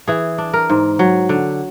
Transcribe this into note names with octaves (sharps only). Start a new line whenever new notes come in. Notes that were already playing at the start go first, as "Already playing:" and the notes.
E3 G#4
D4
A#4
G#2
F#3
D3